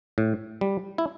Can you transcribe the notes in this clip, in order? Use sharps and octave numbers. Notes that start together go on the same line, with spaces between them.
A2
G3
E4